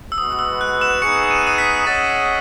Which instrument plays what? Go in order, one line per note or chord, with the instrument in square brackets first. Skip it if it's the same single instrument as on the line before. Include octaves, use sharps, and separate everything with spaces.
[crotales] E6
[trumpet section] G#3 B3 F#4 B4 [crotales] D#6
[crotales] D#6
E6
F#6
E6 E7
[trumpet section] B3 D#4 G#4 [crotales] C#6 C#7
[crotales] D#7
C#7
D#6 D#7
B6
[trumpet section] C#4 G#4 D#5 F#5 [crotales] A6